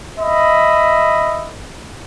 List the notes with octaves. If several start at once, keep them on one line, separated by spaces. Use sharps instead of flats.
D#5 E5 B5